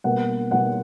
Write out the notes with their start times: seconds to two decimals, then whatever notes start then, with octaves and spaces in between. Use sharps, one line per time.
0.04 B2 G3 A#3 F#5
0.51 B2 G3 A#3 F#5